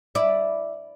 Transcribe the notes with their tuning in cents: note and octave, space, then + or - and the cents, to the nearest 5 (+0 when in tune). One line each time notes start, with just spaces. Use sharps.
E4 -5 D5 +0